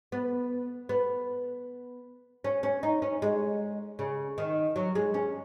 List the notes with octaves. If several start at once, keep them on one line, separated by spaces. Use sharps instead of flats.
B3
B3
C#4
C#4
D#4
C#4
G#3
C#3
D#3
F#3
G#3
C#4